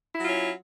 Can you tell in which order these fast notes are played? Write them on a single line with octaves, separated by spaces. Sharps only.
E4 F#3 F4 C#4